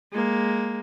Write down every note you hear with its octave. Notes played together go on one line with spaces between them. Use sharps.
G#3 A#3